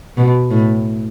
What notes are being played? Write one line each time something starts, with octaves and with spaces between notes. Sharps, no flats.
B2
A2